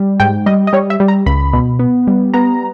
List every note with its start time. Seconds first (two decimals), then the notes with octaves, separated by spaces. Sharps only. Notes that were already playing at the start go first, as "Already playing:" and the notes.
Already playing: G3
0.20 G#2 G5
0.46 G3 D#5
0.67 D#5
0.73 G3 C#5
0.90 E5
1.00 G3
1.08 A#5
1.26 C#2 B5
1.53 B2
1.79 B3
2.07 G3
2.34 B3 A#5